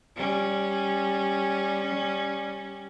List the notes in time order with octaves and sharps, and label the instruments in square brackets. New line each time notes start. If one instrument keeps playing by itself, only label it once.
[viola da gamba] G3 C#4